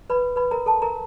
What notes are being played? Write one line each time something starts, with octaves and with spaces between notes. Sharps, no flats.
B4 B5
B4 B5
A#4 A#5
A4 A5
A#4 A#5